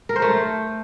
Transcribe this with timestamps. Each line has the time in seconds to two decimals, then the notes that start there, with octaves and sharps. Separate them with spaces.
0.09 A#4
0.16 C5
0.22 A3